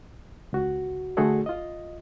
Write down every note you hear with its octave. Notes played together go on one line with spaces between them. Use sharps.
C#2 F#4
D3 A3 F#4 G#4 A4 D5
F4 D#5